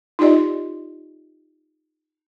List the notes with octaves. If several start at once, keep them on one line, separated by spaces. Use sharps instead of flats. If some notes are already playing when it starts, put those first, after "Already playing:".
D#4 F4 G4 D5 D#5